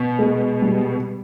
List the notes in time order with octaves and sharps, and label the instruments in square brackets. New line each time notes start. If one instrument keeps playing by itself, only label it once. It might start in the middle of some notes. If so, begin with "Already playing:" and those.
Already playing: [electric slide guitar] B2
[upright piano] G#3
G3